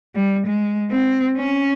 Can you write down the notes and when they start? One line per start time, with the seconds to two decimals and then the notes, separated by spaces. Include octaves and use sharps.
0.15 G3
0.46 G#3
0.92 C4
1.37 C#4